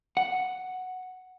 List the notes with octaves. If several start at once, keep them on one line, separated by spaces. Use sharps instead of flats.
F#5